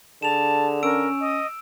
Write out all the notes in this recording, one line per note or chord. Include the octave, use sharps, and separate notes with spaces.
D3 G#4 A5 E7 F7
C#4 A#4 E6 D7
D#5